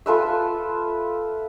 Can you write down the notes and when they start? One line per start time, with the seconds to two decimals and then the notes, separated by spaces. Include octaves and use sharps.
0.06 F4 A4 B4 E5